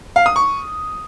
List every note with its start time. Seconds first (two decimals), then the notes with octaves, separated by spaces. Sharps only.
0.16 F5
0.26 D#6
0.36 C#6